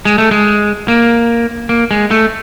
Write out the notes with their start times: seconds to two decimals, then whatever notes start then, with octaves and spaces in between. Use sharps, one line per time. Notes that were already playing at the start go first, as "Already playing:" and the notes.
0.05 G#3
0.18 A3
0.31 G#3
0.88 A#3
1.69 A#3
1.91 G#3
2.11 A3